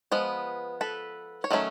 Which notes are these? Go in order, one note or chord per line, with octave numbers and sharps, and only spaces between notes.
F3 G#3 B3 B4
A4 B4
C#5
D#3 F#3 A3 C#4